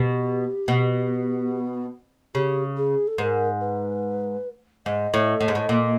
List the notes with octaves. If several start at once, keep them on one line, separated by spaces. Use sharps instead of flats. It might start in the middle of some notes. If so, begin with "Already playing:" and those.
Already playing: B2 G4
B2
C#3 G4
G#4
A4
G#2 A#4 B4
B4
G#2 D#5
A2
A2
G#2
A2
A#2